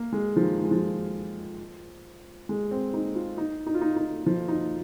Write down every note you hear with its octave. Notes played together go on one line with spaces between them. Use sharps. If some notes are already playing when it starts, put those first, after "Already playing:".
Already playing: A#3
G#3
F3
D#3
G#3
F3
G#3
C4
D#4
F4
D#4
D#4
F4
D#4
D#4
F3
D#4